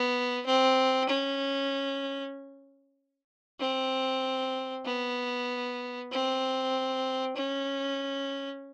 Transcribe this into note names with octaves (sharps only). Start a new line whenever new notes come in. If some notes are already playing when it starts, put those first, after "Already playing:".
Already playing: B3
C4
C#4
C4
B3
C4
C#4